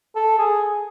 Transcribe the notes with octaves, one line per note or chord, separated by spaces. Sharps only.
A4
G#4